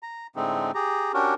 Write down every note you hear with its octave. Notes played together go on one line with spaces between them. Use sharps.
A#5
A2 D3 G#3 A3 C4 D#4
G4 G#4 A#5
C#4 D4 F#4 G4 A#4